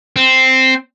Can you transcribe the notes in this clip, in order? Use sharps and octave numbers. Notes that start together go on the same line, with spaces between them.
C4